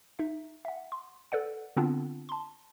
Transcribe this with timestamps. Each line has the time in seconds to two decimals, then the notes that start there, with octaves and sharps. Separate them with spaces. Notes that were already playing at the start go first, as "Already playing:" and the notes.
0.19 D#4 E5
0.65 E5 F#5
0.92 C6
1.32 A4 B4 D5 F#5
1.77 D3 B3 C4 D4 F4
2.29 A5 C6